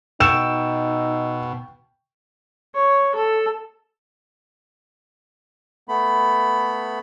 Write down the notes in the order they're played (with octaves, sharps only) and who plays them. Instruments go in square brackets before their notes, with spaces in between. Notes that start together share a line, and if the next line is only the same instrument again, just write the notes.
[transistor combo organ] B2 [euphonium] D#4 [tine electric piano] G5 C#6 [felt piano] E6 E7
[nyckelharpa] C#5
A4
[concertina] A3 B3 B5